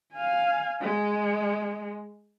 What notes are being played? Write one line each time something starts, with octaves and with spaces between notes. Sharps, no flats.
F5 G#5
G#3